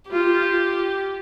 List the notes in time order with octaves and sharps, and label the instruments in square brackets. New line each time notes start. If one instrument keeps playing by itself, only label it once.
[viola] F4 [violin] G4